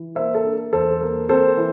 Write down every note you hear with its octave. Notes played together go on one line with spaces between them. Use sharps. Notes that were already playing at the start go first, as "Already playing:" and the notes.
Already playing: E3
A#3 C5 E5
A4
D4
E2 A4 C5
A#3
C4 A4 C5
E3